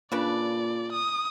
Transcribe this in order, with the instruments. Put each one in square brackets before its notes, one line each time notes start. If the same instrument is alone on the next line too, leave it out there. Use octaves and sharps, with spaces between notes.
[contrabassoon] A#2 [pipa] C#3 D4 B4 [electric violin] D5
[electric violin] D#6